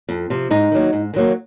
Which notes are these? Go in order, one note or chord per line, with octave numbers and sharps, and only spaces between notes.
F2
C3 F3
G#2 D#4
D#3 F#3 A#3
G#2
D#3 F#3 A#3